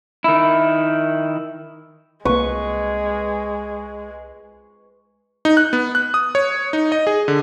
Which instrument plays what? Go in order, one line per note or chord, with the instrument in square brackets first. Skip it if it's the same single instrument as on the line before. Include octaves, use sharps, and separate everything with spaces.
[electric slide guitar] D#3 E4
[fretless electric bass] C2 A#3 [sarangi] G#3 [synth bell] B4 [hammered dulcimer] C#6
[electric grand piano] D#4
F#6
B3
F#6
D#6
C#5
D#4
D#5
G#4
D3